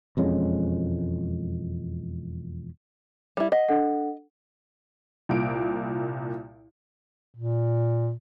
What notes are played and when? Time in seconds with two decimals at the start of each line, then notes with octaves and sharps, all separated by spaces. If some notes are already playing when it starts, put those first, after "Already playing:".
0.17 E1 F2 G#3 C#4
3.37 G3 E4
3.52 D#5 F#5
3.68 D4 A4 F#5
5.29 C2 A#2 D7
7.35 A#2